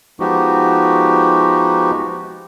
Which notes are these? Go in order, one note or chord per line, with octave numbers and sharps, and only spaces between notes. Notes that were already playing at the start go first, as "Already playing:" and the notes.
F3 G#3 B3 D#4 F#4 G4